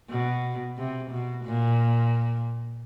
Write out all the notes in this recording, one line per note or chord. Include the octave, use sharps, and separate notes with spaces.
B2
C3
B2
A#2